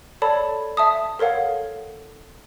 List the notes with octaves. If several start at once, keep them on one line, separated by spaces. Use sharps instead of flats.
A4 C#5 D5 A5 B5
E5 A5 D#6
A4 A#4 C#5 F5 F#5